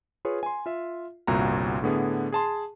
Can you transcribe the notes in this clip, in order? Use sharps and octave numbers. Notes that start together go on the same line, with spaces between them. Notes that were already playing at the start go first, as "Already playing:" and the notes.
F4 G#4 B4 C#5
G#5 C6
F4 E5
G1 C2 A#2 F#4 A#5
A2 D3 B3 G#4
G#4 A5 C6